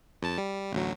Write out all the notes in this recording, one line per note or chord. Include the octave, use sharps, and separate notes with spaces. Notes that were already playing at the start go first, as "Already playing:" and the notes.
F2 A5
G3
A1 D2 F#3